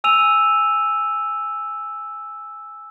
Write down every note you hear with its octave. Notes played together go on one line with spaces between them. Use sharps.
G#5 E6 D#7 F7